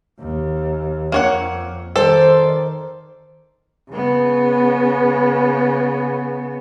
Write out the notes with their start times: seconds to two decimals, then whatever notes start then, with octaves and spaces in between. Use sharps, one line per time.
0.19 D#2
1.12 F2 A#3 C#5 F#5
1.96 D#3 A4 C5 D5
3.91 C#3 B3